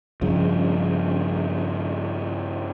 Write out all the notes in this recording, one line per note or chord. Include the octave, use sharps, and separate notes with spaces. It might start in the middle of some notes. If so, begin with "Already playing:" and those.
G2 C#3 F3